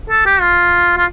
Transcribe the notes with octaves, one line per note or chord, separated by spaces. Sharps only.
A4
G4
F4
F4